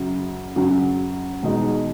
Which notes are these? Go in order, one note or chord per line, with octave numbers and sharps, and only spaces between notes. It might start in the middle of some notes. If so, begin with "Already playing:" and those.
Already playing: F#2 C#3 F#3
F#2 C#3 F#3
E2 B2 G#3 D#4